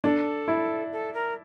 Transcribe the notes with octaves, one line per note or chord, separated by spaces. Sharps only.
D4 A4
E4
A4
A#4